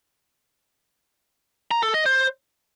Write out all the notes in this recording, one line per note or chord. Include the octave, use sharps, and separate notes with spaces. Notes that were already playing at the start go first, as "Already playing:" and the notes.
A#5
A4
D#5
C5